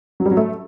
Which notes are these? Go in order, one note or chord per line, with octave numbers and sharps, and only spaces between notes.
F#3
G3
F#3
A3